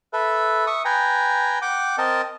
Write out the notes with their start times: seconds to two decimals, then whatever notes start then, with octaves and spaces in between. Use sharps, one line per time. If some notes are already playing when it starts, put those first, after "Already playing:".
0.13 A4 B4 E5
0.67 E5 C#6 D#6
0.85 B4 G5 G#5 A#5
1.62 F#5 G5 D6
1.98 C4 A#4 D#5 A5